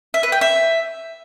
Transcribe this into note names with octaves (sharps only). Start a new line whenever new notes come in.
E5
B4
G5
E5